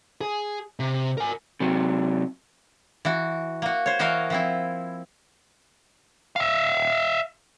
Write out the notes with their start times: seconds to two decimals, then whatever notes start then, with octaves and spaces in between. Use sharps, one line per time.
0.21 G#4
0.80 C3
1.18 A#4 G#5
1.60 C3 F#3
3.05 E3 F#4
3.62 A#3 F#4
3.86 C5 C#5
3.99 E3 F#4 A#4 D#5 F5 G#5
4.30 F3 C4 E4
6.36 E5 F5